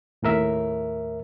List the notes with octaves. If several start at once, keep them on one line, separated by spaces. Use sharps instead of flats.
D#2 A2 A#4 E5